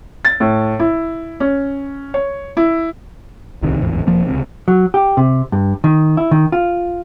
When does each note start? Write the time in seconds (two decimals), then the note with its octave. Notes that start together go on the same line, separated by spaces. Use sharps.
0.25 A6
0.40 A2
0.80 E4
1.40 C#4
2.14 C#5
2.57 E4
3.63 D1 C2 C3 D#3
3.81 D1 G#1 E2
4.07 E1 F3 A#3
4.26 C#2 C3
4.68 F#3
4.94 G4
5.17 C3
5.52 G2
5.84 D#3
6.17 E4
6.31 D#3
6.52 F4